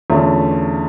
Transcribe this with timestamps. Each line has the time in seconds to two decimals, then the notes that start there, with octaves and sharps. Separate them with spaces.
0.10 E2 D3 A3 C#4 F4